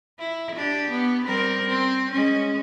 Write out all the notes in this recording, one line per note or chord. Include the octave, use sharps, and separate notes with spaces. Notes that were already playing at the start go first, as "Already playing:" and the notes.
E4
D4 G4
B3
G3 C4 A#4
C4
G#3 C#4